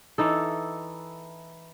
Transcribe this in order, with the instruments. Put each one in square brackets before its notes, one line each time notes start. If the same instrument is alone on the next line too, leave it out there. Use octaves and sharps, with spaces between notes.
[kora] E3 D#4 A4